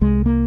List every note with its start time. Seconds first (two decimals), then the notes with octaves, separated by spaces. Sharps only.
0.01 C2 G#3
0.26 A#3